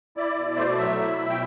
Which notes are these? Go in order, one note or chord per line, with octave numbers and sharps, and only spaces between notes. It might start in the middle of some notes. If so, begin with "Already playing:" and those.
E4 D5
B2
A3 C5
D5
F#3 E5
E4
B2
G5